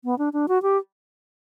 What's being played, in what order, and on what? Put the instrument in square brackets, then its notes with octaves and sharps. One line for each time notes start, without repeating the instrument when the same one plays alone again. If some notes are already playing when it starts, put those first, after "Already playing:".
[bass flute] B3
D4
D4
F#4
G4